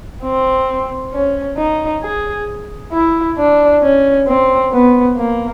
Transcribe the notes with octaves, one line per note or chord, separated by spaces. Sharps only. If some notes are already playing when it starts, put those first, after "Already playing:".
C4
C#4
D#4
G#4
E4
D4
C#4
C4
B3
A#3